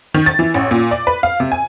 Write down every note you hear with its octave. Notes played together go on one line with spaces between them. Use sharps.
D#3
A6
E3
A1
A#2
D5
B4
F5
C3
G#5